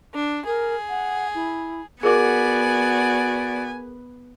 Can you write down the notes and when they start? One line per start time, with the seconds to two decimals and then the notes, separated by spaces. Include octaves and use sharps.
0.14 D4
0.46 G#4 A#4
0.89 F#5
1.34 E4
2.03 B3 F#4 G#4 A#4 D5 G#5 D6